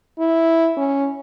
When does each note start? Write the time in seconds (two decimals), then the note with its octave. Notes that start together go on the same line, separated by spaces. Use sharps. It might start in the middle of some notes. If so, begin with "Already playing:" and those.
0.19 E4
0.77 C#4